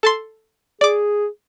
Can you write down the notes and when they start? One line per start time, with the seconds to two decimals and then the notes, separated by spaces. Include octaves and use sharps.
0.03 A4 A5 C6
0.81 G#4 D5 D6